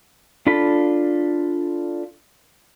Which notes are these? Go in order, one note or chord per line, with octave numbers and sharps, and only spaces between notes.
D4 F4 A4 B5